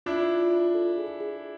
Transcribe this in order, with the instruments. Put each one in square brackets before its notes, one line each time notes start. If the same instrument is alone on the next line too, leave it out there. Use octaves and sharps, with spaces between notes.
[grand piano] D4 E4 [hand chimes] F4
[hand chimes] F4
F4
A4
G#4
G#4